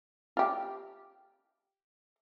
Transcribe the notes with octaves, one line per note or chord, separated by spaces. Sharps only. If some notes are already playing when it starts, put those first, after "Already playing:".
F4 G4